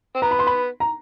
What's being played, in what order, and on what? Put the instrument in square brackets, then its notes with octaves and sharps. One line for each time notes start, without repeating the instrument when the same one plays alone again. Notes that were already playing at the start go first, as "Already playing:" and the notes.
[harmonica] C4
[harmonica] B3 [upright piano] A#5
[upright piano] B5
C6
B5
A#5